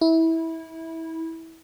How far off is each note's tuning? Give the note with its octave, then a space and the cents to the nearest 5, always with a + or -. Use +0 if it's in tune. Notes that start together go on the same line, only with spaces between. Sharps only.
E4 -20